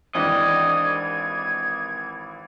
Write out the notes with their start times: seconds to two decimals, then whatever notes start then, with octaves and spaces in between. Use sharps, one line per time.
0.15 G#1 D#3 E3 D4 G4 D#5 G#6